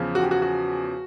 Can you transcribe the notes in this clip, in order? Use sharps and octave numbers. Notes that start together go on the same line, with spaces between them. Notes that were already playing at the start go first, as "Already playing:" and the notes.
Already playing: E2 C#3 F3
F#4
G4
F#4
F#4